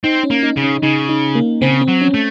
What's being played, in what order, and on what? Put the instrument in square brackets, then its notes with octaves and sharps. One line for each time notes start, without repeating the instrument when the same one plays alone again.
[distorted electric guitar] C4 [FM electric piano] D#4
[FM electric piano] C#4
[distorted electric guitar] A#3
[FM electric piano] D#4
[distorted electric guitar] C#3
[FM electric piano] C#4
[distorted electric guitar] C#3 [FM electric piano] D#4
[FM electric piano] D#4
A#3
[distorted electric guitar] C#3 [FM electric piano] C4
[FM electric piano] C4
[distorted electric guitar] F#3
[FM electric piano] C#4
[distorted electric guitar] A3